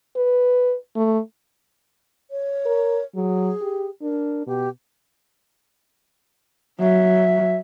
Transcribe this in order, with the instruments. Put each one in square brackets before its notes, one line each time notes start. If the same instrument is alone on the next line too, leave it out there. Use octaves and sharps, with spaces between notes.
[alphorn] B4
A3
[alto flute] C#5
[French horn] A#4
[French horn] F#3 [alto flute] G#4
[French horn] G4
[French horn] D4 [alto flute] A#4
[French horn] B2 [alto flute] G4
[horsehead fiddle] F#3 [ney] E5